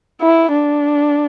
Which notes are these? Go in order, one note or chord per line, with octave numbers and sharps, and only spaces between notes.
E4
D4